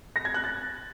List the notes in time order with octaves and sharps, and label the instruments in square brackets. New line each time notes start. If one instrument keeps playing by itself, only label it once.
[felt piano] A#6
G#6
F#6
A6